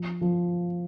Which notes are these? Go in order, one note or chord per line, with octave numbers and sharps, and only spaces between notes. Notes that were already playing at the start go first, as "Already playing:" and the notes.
Already playing: F3
F3